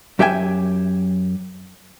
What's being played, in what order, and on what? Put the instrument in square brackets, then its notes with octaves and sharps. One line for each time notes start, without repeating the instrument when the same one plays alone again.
[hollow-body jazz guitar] F#2 G4 E5 G5 G#5